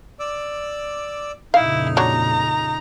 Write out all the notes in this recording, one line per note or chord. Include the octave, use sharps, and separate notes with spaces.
D5 D6 E6
F2 A#2 C#3 D#4 E4 F5
F#3 D4 C#5 A#5